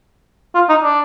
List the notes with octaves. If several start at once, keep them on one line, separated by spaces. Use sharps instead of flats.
F4
D#4
D4